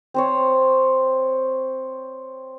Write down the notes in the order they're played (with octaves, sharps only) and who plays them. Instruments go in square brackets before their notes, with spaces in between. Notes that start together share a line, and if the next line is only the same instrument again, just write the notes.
[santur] C4 C5 C#5